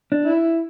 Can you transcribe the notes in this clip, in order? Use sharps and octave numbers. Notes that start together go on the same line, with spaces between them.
D4
E4